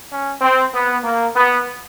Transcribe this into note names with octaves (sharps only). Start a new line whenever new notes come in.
C#4
C4
B3
A#3
B3